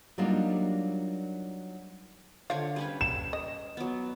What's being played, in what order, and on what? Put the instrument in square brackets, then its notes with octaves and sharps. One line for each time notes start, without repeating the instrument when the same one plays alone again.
[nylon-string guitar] F#3 G3 A#3 D4 D#4 F4
[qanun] D3 D4 C#5 [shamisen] F4 C5 F5
[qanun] G3 C#4 B4
[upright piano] E7
[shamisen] D#5
[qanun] F#3 B3